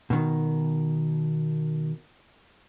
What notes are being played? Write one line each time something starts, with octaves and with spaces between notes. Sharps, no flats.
B2 D#3